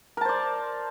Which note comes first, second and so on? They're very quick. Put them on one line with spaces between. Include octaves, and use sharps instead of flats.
A#4 A5 C5 D5